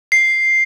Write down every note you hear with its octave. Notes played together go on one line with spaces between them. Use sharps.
C7